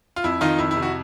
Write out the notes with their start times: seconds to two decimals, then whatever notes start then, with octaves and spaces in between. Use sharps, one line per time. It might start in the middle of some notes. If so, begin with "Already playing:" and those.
0.16 F4
0.24 F2 E4
0.41 D#3 D#4 F4
0.59 F2 E4
0.71 E4
0.77 C3
0.82 E4 F#4